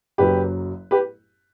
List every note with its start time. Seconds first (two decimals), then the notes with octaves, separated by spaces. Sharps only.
0.18 F#1 F#2 F#3 G4 B4
0.91 G4 B4